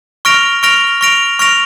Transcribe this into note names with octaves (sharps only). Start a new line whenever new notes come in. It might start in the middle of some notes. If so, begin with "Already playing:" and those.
C#6 F6 A#6 D7 F7
C#6 F6 A#6 D7 F7
C#6 F6 A#6 D7 F7
C#6 F6 A#6 D7 F7